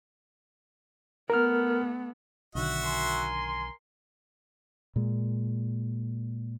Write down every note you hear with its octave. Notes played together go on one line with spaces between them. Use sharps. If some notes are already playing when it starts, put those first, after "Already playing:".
A3 B3 A#4 F6
B1 D3 D#3 F#4 E5 F#5
A#4 G#5 C6
A#2 G#3